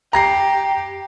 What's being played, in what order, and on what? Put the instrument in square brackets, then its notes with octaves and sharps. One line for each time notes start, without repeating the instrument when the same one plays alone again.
[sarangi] G4 [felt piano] A#5 A#6 C7